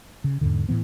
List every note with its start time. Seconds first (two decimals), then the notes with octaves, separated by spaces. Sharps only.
0.24 C#3
0.41 E2 G#2 D3
0.69 A2 E3 B3